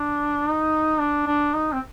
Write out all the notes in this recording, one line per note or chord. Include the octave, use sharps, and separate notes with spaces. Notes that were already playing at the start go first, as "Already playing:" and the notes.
Already playing: D4
D#4
D4
D4
D#4
C4